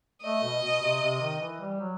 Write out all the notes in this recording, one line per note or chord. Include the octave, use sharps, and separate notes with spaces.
A3 D#5
B2
B2
C3
C3
D#3
E3
G3
F#3